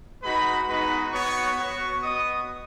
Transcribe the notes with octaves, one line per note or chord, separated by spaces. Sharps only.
G#3 D#4 F#4 B4 B5
G#3 B3 D#4 F#4 B4 B5
B3 F#4 C#5 C#6
B3 F#4 C#5 C#6
B3 F#4 D#5 D#6